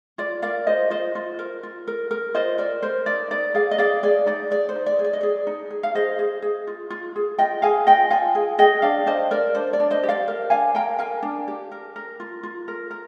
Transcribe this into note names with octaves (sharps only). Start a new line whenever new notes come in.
F4 D5
A#4 D5 F5
F4 C5 D#5
F4 C5 D#5
F4
A#4
F4
A#4
A#4
F4 C5 D#5
A#4 D5
A#4 C5
D#4 D5
D#4 D5
G#4 D5 F5
D#5
G#4 D5 F5
G#4 D5
D#4 D5
G#4 D5
C5
D#4
D5
G#4
D5
D#5
G#4 D5
D#4
G#4
F5
G#4 C5 D#5
G#4
G#4
F4
F4
G#4
F4 D#5 G5
G#4 F5 G#5
F4 D#5 G5
F4 F5 G#5
G#4
G#4 D#5 G5
D4 D5 F5
D4 C5 D#5
A#4 D5
D4 C5
D5
D4
C5 D#5
G4
D5 F5
A#4
D4 F5 G#5
A#4 G5 A#5
A#4 F5 G#5
D4
G4
A#4
A#4
F4
F4
A#4
A#4